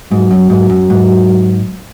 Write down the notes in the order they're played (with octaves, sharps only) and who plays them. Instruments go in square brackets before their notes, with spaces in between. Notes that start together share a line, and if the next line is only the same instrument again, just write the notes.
[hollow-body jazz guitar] G#2 [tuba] F#3
[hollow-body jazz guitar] F#2
G#2
F#2
G#2